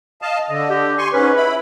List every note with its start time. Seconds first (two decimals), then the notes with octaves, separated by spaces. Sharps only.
0.22 D#5 F5 A5
0.49 D3 D#5
0.70 G4
0.98 G#5 C6 C#6
1.13 G#2 C#4 B4
1.37 E4 B5